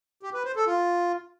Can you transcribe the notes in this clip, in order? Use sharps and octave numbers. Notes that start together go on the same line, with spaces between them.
G4
B4
C5
A4
F4